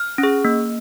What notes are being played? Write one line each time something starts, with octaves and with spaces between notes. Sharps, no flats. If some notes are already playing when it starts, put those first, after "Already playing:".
Already playing: F6
C#4
G#4
A#3